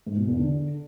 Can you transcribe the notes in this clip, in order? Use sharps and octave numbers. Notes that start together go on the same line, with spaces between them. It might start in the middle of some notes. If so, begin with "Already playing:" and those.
G#2
B2
E2
D3